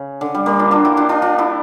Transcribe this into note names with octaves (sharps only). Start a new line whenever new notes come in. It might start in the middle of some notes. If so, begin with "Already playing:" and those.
Already playing: C#3
D3
G3
G3 A#3
D4 F4
D4 F4
E4 G4
D4 F4
D4 F4
D4 F4
E4 G4